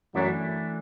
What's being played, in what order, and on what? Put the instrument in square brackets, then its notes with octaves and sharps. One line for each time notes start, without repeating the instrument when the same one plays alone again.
[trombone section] F#2 F#3 [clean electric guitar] E3 A3 D4